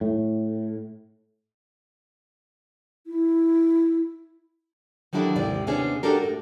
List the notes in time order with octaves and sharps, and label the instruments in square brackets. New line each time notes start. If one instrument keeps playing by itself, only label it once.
[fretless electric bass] A2
[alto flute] E4
[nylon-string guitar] D#3 F#3 G3 D4 E4 A4
D#2 G#2 C3 E4 D5
D#2 C3 B3 C#4 D4 G#4
D4 F#4 G4 A4 A#4
A2